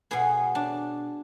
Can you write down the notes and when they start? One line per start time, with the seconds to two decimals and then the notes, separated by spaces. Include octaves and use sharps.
0.11 B2 B3 G#4
0.55 D4